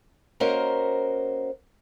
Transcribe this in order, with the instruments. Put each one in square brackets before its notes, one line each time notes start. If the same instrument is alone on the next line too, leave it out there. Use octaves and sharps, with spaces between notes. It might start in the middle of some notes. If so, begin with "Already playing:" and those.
[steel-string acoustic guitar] A#3 C#4 F#4 A#4 C5 D#5